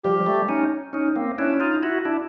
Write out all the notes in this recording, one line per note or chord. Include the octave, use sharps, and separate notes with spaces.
F3 G3 G4
G3 A3
C#4 D#4
C#4 D#4
A#3 C4
C#4 D4 E4
D#4 F4
E4 F#4
D4 E4